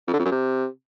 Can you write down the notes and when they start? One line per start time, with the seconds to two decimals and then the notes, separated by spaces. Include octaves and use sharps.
0.07 F2
0.13 D3
0.19 F2
0.25 F#2
0.31 C3